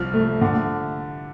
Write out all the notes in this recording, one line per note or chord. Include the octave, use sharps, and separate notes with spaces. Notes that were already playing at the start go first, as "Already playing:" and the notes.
Already playing: C2 F3 F6
A3
D3